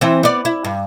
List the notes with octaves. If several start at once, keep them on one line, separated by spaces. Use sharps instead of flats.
E3 C4
B3 D5
E4
G2